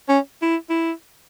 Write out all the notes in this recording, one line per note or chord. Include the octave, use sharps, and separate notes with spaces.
C#4
E4
E4